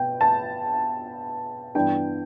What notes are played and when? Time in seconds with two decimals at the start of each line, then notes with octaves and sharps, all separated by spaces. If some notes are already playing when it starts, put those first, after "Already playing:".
Already playing: B2 G5
0.21 A5
1.75 G2 E3 B3 D4 G5